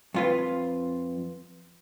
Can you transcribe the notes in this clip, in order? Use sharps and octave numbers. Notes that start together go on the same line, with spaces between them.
F2 F4 B4